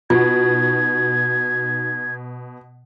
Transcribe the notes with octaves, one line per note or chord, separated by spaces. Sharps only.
B2 D#4 F4 F#4 G#6